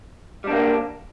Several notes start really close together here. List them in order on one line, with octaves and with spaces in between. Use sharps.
G3 D4 A#3